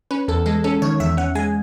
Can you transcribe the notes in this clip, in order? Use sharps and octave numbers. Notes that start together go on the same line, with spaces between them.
C#4 B4
E2 A4
G#3 A4
C#4 A4
D#3 C#5
E2 E5
C#4 F#5
G#3 G#5